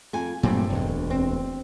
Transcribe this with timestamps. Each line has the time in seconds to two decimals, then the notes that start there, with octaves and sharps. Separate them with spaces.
0.13 F2 G#5
0.43 G2 A#2 F#3 A3 C4
0.70 E1 D2
1.10 C4